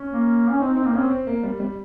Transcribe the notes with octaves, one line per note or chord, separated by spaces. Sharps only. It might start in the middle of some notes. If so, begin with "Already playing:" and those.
Already playing: C#4
A#3
C#4
C4 D#4
C4 D#4
A#3
C4 C#4
C4
A#3
G3
G3